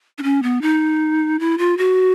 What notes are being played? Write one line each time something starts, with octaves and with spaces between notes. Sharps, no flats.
D4
C#4
B3
D#4
E4
F4
F#4